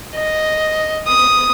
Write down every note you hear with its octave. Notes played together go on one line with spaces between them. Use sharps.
D#5
D#6